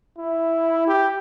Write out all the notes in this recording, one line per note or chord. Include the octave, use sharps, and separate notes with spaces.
E4
G4